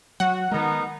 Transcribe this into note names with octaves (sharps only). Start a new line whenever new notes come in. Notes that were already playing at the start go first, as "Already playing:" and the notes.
F#3 F#4 F#5
D#3 G#3 B3 D#4 A#4